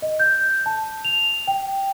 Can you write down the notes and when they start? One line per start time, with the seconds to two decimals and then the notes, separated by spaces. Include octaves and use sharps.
0.02 D#5
0.20 G6
0.66 A5
1.05 F7
1.47 G5